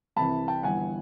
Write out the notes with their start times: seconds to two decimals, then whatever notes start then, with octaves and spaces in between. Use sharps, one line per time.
0.16 C2 C3 E3 A5 B5
0.48 G5 A5
0.63 G1 G2 E3 F#5 G#5